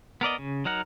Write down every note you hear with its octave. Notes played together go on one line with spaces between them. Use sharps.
B3 A#4 D5 D#5
C#3
F#3 D#4 A#4 F#5